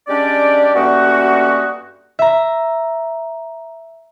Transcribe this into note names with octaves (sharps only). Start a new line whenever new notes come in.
G3 G#3 C#4 D4 G4 D5
G2 A3 A#3 C#4 D#4 F#4
E5 A#5